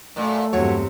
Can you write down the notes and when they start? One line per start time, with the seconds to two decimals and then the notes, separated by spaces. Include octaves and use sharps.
0.16 F#2 A#2 A3
0.53 E2 G2 C3 F#3 C#5